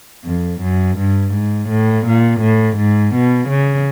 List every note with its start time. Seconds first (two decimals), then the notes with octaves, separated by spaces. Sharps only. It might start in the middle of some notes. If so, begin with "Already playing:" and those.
0.24 F2
0.60 F#2
0.97 G2
1.32 G#2
1.68 A2
2.05 A#2
2.40 A2
2.76 G#2
3.12 B2
3.48 C#3